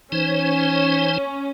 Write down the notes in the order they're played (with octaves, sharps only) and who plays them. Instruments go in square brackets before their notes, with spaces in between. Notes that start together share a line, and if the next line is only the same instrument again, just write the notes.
[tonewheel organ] E3 D#4 C5 [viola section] C#4